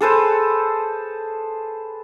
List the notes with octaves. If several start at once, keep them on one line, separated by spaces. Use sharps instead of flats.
G#4 A4 B4 C5